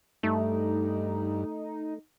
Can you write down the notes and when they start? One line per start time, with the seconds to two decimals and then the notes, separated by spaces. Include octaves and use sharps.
0.23 G2 A3 D#4